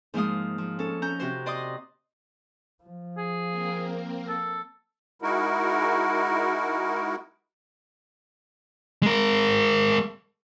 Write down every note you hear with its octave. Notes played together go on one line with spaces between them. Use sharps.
G#2 F3 G#3 A#3 F5 D#6
F3
C#4 A4
C#4 A#5 G6
C3 F#4 C5
D5 D#5 C6 D6 D#6
F3
G#4
A#3 C4 A#4
A4
G#3 D#4 E4 F#4 A#4
G#3 A#4